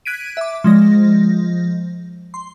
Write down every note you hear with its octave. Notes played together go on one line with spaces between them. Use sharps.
F#6 G#6 B6 D7 D#7
E5 D6
F3 G#3 A#6
C6